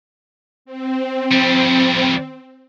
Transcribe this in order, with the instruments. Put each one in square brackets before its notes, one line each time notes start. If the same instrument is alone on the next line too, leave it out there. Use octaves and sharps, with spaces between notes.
[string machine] C4
[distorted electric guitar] F2 G3